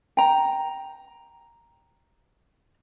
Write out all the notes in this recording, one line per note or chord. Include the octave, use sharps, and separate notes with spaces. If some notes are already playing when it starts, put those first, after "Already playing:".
G5 A#5